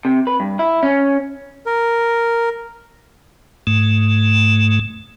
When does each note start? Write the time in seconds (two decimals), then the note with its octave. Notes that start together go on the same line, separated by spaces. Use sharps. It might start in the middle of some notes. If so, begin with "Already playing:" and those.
0.05 C3
0.27 B4
0.40 G2
0.59 E4
0.83 C#4
1.66 A#4
3.67 G#2 A3